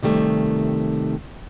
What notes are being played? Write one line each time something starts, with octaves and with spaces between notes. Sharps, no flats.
C3 D#3 G3 A3